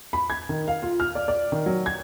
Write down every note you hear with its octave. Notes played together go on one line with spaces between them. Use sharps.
B5
G#6
D#3
F5
F4
F6
D5
D5
D#3
F#3
G#6